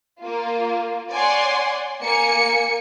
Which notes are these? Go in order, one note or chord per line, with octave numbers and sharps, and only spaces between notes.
A#3 F4
C#5 D5 F#5 G#5 C6
A#3 G#5 C#7